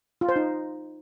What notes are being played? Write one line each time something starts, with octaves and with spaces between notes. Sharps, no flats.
F4
C5
D#4